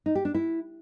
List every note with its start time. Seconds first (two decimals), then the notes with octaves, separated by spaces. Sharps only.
0.06 D#4
0.15 G4
0.25 D4
0.34 E4